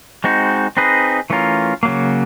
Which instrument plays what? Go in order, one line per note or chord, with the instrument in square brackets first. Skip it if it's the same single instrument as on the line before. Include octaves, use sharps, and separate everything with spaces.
[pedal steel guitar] G#3 C4 D#4 F#4
C4 D#4 G#4 B4 D#5
E3 A3 C#4 F4 A#4
C#3 F#3 A#3